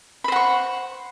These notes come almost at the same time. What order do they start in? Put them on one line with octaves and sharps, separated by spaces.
B5 C5 F#5 C#6